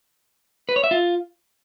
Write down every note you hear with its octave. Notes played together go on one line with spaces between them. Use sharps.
B4
C#5
E5
F4